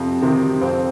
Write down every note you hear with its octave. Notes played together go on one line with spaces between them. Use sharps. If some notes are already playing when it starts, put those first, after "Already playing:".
Already playing: F2 C3
C3 D#3
F2 C4